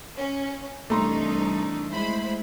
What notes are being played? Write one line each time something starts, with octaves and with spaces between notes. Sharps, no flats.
C#4
C2 E3 A3 D4 D#4 A#5 C6
G#3 A3 E4 C5 B5